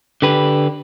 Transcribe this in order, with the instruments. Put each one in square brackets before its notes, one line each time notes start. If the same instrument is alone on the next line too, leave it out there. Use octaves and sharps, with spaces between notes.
[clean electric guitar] D3 G4 B4